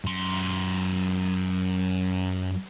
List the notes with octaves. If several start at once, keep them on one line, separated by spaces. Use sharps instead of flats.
F#2 C6